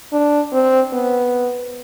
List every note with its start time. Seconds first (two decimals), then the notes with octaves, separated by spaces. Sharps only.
0.13 D4
0.53 C4
0.93 B3